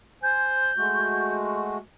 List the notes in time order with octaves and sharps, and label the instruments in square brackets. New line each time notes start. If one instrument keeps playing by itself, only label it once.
[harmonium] C5 G#5 [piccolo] G6
[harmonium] G#3 A3 F#4